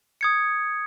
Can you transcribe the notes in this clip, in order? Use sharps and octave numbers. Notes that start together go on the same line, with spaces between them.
D#6 G#6 C#7